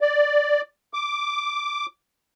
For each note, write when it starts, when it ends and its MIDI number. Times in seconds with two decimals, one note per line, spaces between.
0.01 0.61 74
0.94 1.86 86